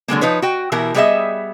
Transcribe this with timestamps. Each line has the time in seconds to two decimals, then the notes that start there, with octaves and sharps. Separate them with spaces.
0.08 D3 F#3 G#3 A#3
0.21 F3 D#4 B4 C#5
0.42 F#4 G5
0.72 B2 E3 E4 G4 A#4
0.94 G3 B3 G#4 A#4 D#5 E5